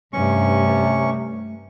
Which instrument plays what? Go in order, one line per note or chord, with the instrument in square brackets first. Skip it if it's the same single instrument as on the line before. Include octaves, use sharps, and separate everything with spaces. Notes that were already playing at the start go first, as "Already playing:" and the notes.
[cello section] G2 [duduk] C3 [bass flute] A3 [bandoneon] C#4 C#6